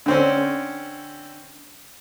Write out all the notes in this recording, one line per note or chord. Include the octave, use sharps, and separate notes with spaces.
D3 C4 C#4